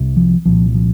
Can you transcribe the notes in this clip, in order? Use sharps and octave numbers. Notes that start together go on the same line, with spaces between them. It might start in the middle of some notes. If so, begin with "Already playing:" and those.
Already playing: C2 C3
F3
C2 A#2 F3
F3